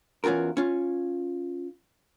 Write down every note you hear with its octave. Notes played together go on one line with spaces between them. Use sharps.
E2 C#4 F4 F#4 A#4
C#4 F4